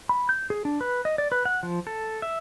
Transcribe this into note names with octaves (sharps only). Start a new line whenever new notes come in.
B5
G6
G#4
D4
B4
D#5
D5
B4
F#5
F3
A4
E5